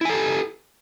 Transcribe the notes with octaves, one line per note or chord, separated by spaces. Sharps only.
E4 G4 A4 G#5